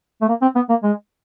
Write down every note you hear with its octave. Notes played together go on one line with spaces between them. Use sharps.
A3
A#3
C4
B3
A#3
G#3